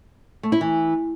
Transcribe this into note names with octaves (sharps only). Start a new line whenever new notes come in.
A3
E4
E3